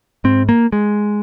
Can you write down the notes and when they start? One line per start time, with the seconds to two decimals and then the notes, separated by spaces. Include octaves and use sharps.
0.24 G#2 C4
0.49 A#3
0.72 G#3